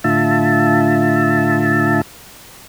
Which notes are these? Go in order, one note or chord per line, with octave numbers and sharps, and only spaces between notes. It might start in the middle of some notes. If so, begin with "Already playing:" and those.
A2 D3 F4 E5 A5